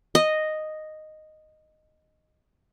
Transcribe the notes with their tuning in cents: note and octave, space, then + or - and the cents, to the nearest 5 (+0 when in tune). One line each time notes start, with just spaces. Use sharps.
D#5 -5